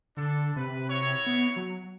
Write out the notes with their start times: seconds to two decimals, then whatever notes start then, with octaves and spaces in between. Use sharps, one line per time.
0.17 D3 D4 A4
0.56 C3 B4
0.90 E4 F#4 C#5
1.27 B3
1.56 F#3